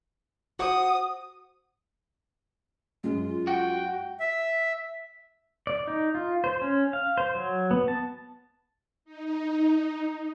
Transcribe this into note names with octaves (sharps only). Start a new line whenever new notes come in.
F#4 C5 F#5 D#6
F#2 G#3 F4
F#4 G5
E5
D5
D#4
F4
C5
C#4
F5
C5
F#3
B3
A5
D#4